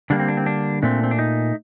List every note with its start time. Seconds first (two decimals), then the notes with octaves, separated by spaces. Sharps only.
0.10 D3 G3 A#3 D4
0.20 C4
0.28 D4
0.37 C4
0.46 D4
0.83 A#2 A3 C4 D4
1.04 C4
1.11 D4
1.19 D#4